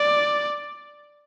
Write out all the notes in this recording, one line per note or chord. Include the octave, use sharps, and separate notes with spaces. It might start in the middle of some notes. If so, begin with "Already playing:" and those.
Already playing: D5